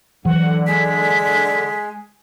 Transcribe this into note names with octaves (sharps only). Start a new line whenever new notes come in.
D3 E3 F#3 F#5
G#3 B6